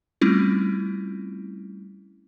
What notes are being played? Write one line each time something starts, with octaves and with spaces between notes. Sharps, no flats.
G3 A3 C4 C#4 E4 F4